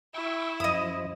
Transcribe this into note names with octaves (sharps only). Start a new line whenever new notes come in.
E4 G5 C#6 E6
F#2 F3 D#5 D#6